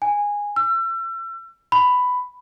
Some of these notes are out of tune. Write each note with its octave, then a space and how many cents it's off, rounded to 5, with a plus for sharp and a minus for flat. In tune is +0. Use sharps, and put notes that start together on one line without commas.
G#5 -15
E6 +35
B5 +10